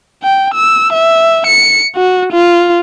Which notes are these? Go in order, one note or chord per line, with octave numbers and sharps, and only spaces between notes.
G5
E6
E5
C#7
F#4
F4